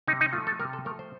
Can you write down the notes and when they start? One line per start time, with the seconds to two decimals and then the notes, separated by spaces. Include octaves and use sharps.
0.07 C3 D#4
0.21 D#4
0.33 F3 A3 F4
0.47 A4
0.59 C3 A#4
0.73 A4
0.85 F3 A3 A#4
0.99 C5